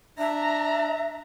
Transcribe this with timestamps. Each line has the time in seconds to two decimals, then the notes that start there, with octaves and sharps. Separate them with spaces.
0.18 D4 E5 A#5